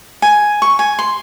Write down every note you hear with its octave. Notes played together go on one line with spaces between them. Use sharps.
G#5
C#6
G#5
C6